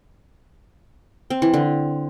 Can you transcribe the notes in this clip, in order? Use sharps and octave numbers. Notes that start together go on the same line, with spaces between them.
C4
E3
D3